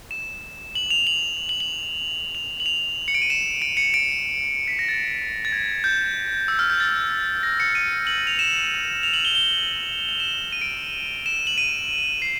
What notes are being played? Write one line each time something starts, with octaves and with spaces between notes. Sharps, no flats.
E7
F#7
F7
F#7
F#7
F#7
F7
F#7
F7
C#7
D7
D#7
E7
D7
C#7
D7
B6
A#6
A6
A6
G#6
G6
E6
F6
G6
A6
A#6
C#7
D#7
F#7
F7
E7
F7
F#7
G7
G7
F7
E7
D#7
D7
E7
F#7
D#7
C7